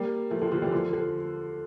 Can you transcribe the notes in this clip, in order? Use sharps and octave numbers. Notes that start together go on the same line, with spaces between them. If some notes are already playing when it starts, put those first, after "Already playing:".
Already playing: G3 A#3
F3 A3
D3 F3
D3 F3
E3 G3
D3 F3
D3 F3